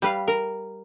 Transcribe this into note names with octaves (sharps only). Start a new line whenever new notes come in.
G3 B4 F5
A#4